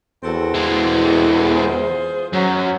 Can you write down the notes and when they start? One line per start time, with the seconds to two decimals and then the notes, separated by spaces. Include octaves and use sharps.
0.23 E2 C4 F#4 A4
0.55 E3 G#3
1.55 F4 G#4 C5
2.33 F#2 F#3